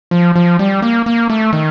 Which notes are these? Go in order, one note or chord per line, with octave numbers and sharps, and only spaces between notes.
F3
F3
G3
A#3
A#3
A3
D#3